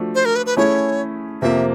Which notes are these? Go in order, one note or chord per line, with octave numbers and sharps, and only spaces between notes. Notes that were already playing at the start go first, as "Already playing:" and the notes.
Already playing: F3 A3 D4 F#4
C5
A#4
B4
B4
A3 C#4 E4 G#4 C#5
F2 C3 F3 A#3 E5